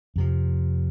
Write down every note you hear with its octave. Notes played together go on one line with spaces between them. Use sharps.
F2 C3 F3